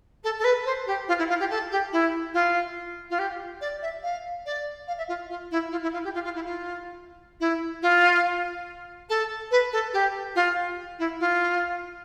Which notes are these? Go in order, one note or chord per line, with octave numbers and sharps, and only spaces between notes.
A4
A4
B4
C5
G4
F4
E4
F4
G4
A4
G4
E4
F4
F4
G4
D5
E5
F5
D5
F5
E5
F4
F4
E4
F4
E4
F4
G4
F4
F4
E4
F4
E4
F4
A4
B4
A4
G4
F4
E4
F4